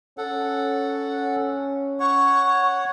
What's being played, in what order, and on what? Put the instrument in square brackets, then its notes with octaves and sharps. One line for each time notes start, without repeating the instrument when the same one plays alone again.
[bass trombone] C#4 [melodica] A4 F#5
[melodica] C#5 F#5 [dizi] C#6